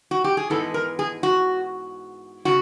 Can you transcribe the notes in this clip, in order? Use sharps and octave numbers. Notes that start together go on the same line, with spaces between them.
F#4
G4
G#4
G#2 E3 G#3 B3 A4
A#4
G#4
F#4
C#3 F#4